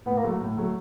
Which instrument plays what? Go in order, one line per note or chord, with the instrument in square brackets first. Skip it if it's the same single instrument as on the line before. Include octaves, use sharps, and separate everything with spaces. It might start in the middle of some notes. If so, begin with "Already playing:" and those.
[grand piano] A2 [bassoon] B3
[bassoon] A#3
[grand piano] F#3 A3
A2
F#3 A3